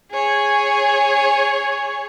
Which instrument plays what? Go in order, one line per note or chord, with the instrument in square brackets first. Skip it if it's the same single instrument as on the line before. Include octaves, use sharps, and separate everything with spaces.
[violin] G#4 C#5